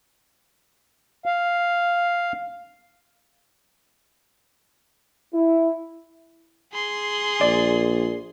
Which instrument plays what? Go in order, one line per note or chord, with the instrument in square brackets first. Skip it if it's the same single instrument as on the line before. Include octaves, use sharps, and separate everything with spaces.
[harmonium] F5
[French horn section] E4
[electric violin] G#4 C6
[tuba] A#1 [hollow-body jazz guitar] D5